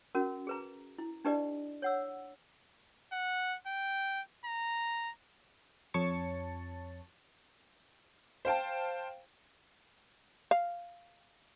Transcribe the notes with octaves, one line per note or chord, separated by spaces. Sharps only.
C#4 F#4 A#4
G#4 B4 A#5
E4
D4 D#4 G4 B4 D5 D#5
C#5 F#5 E6
F#5
G5
A#5
F2 C#5 A5 C#6 A6
C5 F5 G5 A5
F5